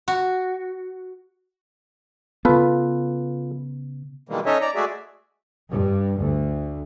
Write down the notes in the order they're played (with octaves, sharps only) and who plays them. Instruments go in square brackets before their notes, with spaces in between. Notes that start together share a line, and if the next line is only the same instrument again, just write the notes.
[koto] F#4
[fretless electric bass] C#3 B3 [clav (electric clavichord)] F4 A4 B4
[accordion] B2 D#3 E3 G3 G#3 A#3
C#4 D#4 A4 C#5 D#5 E5
D5 A#5
G#3 A3 F#4 G#4 D5 E5
[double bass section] G2
D2